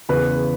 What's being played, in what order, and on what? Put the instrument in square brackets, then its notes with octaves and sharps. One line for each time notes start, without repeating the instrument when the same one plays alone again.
[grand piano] E2 C#3 E3 B4 B5